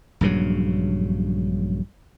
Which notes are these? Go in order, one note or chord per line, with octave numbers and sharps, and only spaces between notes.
A#1 G2 C#3 F#3